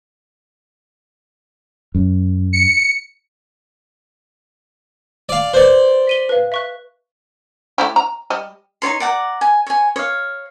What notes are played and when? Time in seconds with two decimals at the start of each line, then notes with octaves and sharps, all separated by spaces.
1.95 F#2
2.53 C#7
5.29 D5 F5
5.54 B4 C5 D5 G6
6.07 B6 D#7 G7
6.29 B4 F5
6.52 E5 C#6 F#6
7.78 A3 E4 G4
7.96 A#5
8.30 G3 D#5
8.82 D#4 F4 C#5 C6
9.00 D5 F#5 G5 A#5
9.41 G#5
9.67 C#5 G#5
9.96 C#5 F5